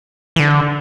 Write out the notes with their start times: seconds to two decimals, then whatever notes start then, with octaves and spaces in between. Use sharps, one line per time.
0.36 E3
0.40 D3